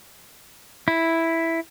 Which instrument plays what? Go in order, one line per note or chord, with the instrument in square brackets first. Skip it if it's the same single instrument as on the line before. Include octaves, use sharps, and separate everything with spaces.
[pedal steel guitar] E4